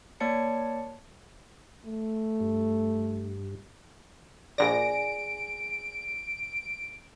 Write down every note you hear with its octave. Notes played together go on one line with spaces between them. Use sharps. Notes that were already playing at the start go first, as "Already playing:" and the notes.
A#3 C#5 D5 A5 C#7
A3
G2
A#1 G#4 D5 A#6 D7